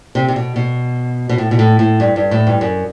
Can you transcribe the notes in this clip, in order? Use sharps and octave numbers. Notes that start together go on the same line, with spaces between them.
C3
C3
B2
B2
B2
A2
B2
A2
A2
G2
G2
A2
G2
F#2